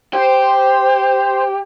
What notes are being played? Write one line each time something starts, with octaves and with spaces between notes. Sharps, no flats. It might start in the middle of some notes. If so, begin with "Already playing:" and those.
G4 C5